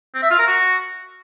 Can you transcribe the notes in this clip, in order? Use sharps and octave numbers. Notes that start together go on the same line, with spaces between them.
C4
E5
F4
A#4
F#4